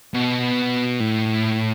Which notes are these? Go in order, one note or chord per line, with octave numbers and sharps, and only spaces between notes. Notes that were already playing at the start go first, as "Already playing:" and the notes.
B2
A2